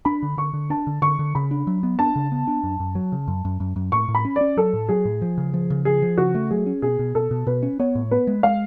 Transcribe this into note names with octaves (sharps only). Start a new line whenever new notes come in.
D4 B5
D3
D3 C#6
D3
D4 A5
D3
D3 C#6
D3
C#3 B5
D4
F#3
B3
D4 A5
C#3
B3
D4
F#2
F#2
F#3
C#3
F#2
F#2
F#2
F#2
A2 C#6
A2
B5
C#4
C#4 D5
F#3 A4
A2
F#3 G#4
A2
F3
C#3
F3
C#3
F3 G#4
F3
C#3 F#4
A3
F#3 G#4
C#4
B2 G#4
B2
B2 A4
B2
B2 B4
C#4
B3 C#5
A2
B3 B4
G#3
G#3 F5